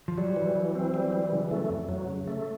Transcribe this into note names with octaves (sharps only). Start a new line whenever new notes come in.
F3
F#3 G3
E3
E3
C4
G3
E3
C#3
A3
F2
F#3
C#3
A3